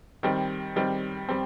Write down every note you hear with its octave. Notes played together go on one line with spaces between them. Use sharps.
D#3 G3 C4
D#3 G3 C4
G3 C4